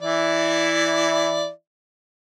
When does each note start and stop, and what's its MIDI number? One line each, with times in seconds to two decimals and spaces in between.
0.01 1.49 52
0.01 1.49 64
0.01 1.49 74